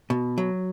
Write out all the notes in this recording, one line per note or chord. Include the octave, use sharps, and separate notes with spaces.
B2
F#3